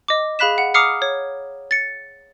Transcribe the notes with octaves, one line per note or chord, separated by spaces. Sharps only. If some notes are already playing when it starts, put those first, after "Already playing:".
D#5 D6
G#4 F5 B5 F#6 B6 E7
F#5
A#5 D6 D#6 F6 C7 C#7
C#5
A6 C#7